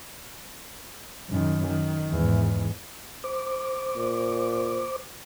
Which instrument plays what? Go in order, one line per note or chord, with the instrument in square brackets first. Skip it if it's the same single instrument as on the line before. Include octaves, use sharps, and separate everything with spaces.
[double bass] F#2 D#3
D#3
E2 G#2
[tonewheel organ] C5 D6
[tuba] A#2